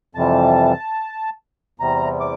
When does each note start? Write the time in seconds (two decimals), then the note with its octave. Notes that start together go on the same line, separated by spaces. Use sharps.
0.15 F2 C3 E3 G3 A5
1.80 E2 C3 G3 A#5
2.20 D6